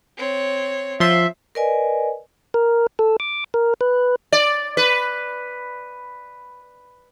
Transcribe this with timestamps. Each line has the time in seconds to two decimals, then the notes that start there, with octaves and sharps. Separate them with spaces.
0.17 C4 C#5
1.00 F3 E5 C6
1.55 A#4 B4 D5 D#5 G#5
2.54 A#4
2.99 A4
3.20 D6
3.54 A#4
3.81 B4
4.32 D5
4.77 B4